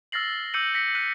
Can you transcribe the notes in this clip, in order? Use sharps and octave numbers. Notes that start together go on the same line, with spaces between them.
E6 F6 A6 A#6 C7 F#7
D6 E6 G6 C#7 D#7 F#7
A#6 B6 C#7
F#6 B6 D#7 F#7